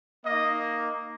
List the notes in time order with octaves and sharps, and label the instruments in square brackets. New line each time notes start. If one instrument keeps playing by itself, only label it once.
[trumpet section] A#3 D#4 D#5